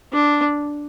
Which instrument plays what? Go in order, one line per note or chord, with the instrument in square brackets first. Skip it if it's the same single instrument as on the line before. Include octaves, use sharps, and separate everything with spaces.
[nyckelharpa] D4